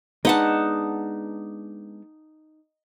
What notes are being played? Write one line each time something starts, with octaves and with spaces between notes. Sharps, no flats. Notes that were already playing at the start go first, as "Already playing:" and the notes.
G#3 B3 D4 D#4 F#5 A5